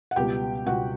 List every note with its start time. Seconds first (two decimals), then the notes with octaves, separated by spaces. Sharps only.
0.11 F#5
0.16 C#2 B2 G3 B3 G4 G5
0.66 C#2 B2 G3 B3 F#4 F#5